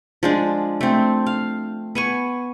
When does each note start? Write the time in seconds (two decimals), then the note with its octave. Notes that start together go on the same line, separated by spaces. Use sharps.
0.23 F3 G#3 D4
0.81 A3 C4
1.26 F5
1.95 B3 G#5 C#6